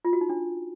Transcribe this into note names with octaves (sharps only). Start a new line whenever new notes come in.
F4
F#4
D#4
D4